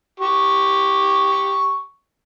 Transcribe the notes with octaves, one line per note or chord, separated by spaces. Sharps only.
G4 C#6